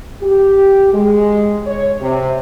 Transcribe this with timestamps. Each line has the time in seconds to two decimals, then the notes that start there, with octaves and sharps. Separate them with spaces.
0.22 G4
0.93 G#3
1.66 C#5
2.01 C3